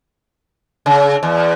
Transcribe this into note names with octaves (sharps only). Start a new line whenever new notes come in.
C#3
E2